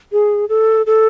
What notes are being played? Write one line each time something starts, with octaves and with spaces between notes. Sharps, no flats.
G#4
A4
A4